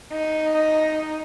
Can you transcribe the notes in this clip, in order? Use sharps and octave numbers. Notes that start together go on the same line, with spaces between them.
D#4